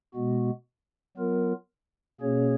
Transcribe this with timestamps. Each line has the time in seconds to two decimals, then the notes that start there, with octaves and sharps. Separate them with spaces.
0.14 B2 G#3 B3 F#4
1.17 F#3 B3 F4 A#4
2.20 B2 A#3 C#4 G#4 C#5